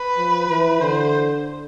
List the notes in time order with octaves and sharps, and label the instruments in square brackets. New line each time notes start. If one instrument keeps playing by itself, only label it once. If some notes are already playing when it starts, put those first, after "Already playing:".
Already playing: [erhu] B4
[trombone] F3
E3
[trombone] D3 [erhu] C5